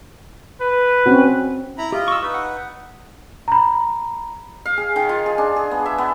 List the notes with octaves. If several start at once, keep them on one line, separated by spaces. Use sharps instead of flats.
B4
C4 C#4 F#4
E4 A#5 B5
F4 G4 D#5
C#6 E6
D#4 B4
F#5
A#5 B5
F5
G#4
D#3
F4
G#4
D4
G#4
B3
E5
B3